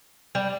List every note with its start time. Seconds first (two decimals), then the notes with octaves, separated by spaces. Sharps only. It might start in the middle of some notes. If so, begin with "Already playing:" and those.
0.35 G3